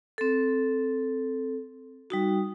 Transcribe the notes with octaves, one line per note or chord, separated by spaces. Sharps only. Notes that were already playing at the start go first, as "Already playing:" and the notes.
C4 A4
G3 D#4 F#4